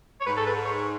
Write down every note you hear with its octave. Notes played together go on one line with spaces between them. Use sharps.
C#5
G#2 B4
A4
B4
C#5